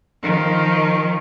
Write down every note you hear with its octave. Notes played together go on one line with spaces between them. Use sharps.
D#3 F3